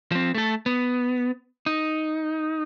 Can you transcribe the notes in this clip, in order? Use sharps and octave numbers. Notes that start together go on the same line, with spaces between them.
F3 C4
A3 A4
B3
D#4